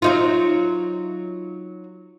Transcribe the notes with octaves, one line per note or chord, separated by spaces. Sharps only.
F#3 D#4 F4